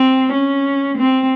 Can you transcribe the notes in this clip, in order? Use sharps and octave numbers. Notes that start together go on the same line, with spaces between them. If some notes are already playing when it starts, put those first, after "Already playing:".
Already playing: C4
C#4
C4